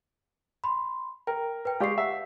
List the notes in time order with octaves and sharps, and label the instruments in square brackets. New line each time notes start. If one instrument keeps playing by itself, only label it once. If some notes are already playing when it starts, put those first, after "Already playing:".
[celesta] B5 C6
[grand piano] A#4 [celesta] G5
[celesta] B4 G5
[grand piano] G#3 G4 D5 [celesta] F5 C#6 C7
[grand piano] E5 F#5